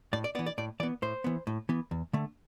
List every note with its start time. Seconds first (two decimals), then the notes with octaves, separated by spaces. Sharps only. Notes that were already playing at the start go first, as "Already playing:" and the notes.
0.13 A2 D5
0.24 D5
0.35 B3 D5
0.39 E3
0.46 D5
0.58 A2 D5
0.80 E3 D5
0.83 B3
1.02 A2 C5
1.24 E3 B3
1.47 A2
1.69 E3 B3
1.91 E2
2.13 D3 A3